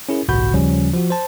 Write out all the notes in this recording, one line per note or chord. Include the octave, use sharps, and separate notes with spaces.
C#4 E4 G#4 A#4
G1 C2 A2 F#4 B5 G6
D#2 C#3 F3 G3 C#4
F3 F#4
C5 A5